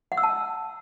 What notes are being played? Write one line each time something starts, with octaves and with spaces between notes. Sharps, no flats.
F#5
E6
A5